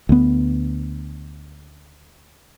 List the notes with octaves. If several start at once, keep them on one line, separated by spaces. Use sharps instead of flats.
D2 B3